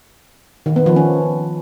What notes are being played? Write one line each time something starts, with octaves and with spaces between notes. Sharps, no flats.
D#3
B3
F3
C#4